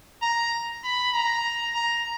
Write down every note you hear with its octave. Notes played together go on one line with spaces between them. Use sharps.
A#5
B5
A#5
A#5